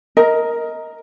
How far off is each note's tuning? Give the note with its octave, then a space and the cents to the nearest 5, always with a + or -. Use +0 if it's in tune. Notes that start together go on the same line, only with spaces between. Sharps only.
A#4 +0 D#5 +20